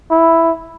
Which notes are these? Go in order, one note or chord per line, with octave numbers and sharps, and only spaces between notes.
E4